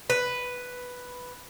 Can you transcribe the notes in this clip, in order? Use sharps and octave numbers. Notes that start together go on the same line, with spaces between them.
B4